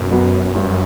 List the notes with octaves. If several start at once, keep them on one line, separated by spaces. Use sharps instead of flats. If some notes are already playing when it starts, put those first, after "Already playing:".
Already playing: B1 F#2
B2 F#3 B3
G2